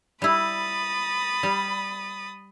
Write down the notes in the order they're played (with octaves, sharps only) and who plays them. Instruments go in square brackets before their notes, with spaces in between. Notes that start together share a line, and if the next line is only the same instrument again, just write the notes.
[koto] G3 E4 [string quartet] B5 D#6 A6
[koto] G3